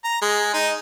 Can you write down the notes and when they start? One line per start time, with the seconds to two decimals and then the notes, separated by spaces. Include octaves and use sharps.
0.04 A#5
0.22 G#3
0.54 D#4